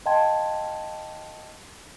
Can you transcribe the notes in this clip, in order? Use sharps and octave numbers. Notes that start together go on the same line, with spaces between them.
D#5 F5 G5 A5 C6 G#6